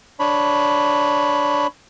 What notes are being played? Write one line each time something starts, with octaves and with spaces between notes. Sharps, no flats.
D4 C#5 B5